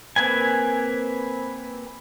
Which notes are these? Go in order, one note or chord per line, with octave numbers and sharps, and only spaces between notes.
A#3 C4 B4 G#5